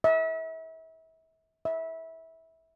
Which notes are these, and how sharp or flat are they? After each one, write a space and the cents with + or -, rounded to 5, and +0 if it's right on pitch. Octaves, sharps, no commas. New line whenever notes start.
E5 -35
E5 -20